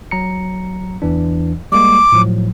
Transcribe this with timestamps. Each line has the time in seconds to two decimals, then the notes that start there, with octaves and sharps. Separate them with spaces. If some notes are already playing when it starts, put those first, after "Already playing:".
0.11 F#3 A#5 C#7
1.02 E2 E3 D4
1.72 G3 G#3 A#3 D6
2.12 A2 F3 F#3